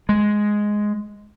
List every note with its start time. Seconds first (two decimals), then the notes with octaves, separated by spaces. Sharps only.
0.09 G#3